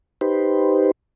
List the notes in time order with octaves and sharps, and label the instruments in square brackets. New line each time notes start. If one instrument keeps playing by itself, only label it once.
[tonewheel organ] D#4 G4 B4 C5